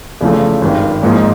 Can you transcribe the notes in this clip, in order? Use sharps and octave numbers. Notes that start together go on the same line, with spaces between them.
E2 C#3 F3 A3
G#1 G2 D#3
G#1 G#2 F3 A#3 D#4